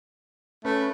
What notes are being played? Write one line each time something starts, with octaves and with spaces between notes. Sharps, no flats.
A3 C#4 B4